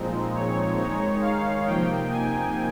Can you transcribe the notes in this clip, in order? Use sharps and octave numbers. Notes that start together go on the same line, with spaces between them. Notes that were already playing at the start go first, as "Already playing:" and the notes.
Already playing: A#2 F3 G#3 C4 D#4
C#5
D#3 G#3 D#4 C#5
F5
C3 F3 A#3 D#4 G5
G#5